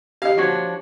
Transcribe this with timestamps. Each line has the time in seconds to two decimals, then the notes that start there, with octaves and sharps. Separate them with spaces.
0.22 G4 D#5 F5
0.38 F3 D4 F#4 C#5